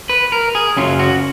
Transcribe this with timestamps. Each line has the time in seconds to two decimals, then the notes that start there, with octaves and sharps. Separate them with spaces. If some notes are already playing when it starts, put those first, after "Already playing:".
0.09 B4
0.32 A#4
0.55 G#4
0.77 F#2 C#3 F#3 C#4 F4
0.99 F#4